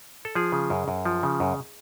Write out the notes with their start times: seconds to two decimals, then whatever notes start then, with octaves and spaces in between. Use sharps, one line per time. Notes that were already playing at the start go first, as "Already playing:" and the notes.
0.25 A4
0.35 F3 G#4
0.52 C#3
0.70 F#2
0.88 F#2
1.05 F3
1.23 C#3
1.40 F#2